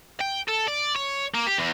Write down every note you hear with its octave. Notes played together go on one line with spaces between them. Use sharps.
G5
A4
D5
C#5
A#3
G4
E2